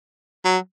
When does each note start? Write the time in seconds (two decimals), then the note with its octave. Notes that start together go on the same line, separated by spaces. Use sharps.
0.45 F#3